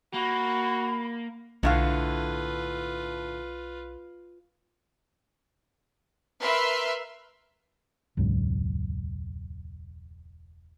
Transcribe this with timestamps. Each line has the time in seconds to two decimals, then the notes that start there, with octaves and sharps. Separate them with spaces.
0.14 A#3 F#4 B5
1.63 B1 A2 D3 F4 B4 F5
6.42 A#4 B4 E5 C6 F6
8.17 E1 C#2 G#2 F#3